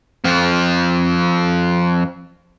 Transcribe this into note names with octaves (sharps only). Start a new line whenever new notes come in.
F2 F3